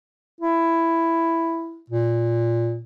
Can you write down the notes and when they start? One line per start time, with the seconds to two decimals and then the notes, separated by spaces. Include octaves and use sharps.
0.41 E4
1.90 A#2